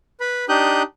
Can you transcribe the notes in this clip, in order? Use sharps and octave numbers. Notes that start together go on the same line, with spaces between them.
B4 B5
D4 D#4 G4 D#6 F#6 G6